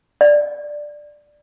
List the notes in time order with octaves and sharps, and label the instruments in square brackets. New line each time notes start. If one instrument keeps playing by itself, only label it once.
[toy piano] D5